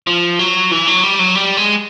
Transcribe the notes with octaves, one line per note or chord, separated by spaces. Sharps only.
F3
F#3
E3
F#3
G3
F#3
G3
G#3